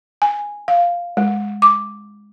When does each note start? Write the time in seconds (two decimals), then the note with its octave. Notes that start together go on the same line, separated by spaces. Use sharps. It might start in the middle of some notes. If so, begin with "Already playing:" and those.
0.22 G#5
0.68 F5
1.17 G#3
1.62 D6